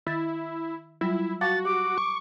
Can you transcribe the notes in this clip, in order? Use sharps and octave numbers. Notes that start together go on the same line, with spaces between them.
D#3 E4 A6
F#3 G3 E4 F4
F#4 F5 A5 D6 A6
G4 D6
C#6